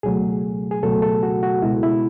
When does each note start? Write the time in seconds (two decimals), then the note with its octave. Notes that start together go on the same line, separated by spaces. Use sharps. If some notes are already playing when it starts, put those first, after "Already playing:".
0.03 C#2 B2 F#3 A3 G#4
0.71 G#4
0.83 C#2 B2 F#3 A3 A4
1.02 A4
1.23 F#4
1.43 F#4
1.62 C#2 B2 G#3 E4
1.83 E4